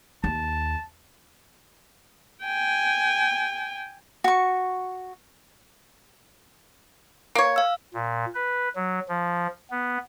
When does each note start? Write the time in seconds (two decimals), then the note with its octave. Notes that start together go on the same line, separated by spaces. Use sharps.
0.24 D#2 A5
2.44 G5 G#5
4.24 F#4 C#6
7.35 A#3 C#5
7.56 F5 E6
7.94 A#2
8.34 B4
8.76 F#3
9.09 F3
9.71 B3